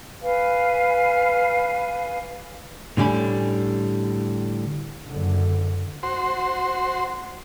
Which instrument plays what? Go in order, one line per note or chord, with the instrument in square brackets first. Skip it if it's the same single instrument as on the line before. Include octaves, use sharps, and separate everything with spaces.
[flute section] B4 F5 G#5
[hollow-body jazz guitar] A2 D3 G3 C#4 B5
[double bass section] F#1 D3
[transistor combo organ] F#4 C5 C6